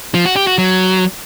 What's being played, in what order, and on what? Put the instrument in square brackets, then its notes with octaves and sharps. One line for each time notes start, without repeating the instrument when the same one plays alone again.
[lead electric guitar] F3
F#4
G4
F#4
F#3